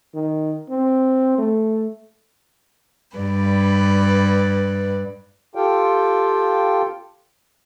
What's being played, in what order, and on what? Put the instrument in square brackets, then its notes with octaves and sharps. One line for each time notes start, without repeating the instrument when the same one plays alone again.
[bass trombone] D#3
C4
A3
[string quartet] G2 B4 D5
[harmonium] F4 G4 A4 F5 G5